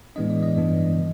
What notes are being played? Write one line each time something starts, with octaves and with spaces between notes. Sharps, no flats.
A2 E3 G#3 B3 D4 D#5
D5
D#5
G2 E3 G3 B3 D4
C#3 F3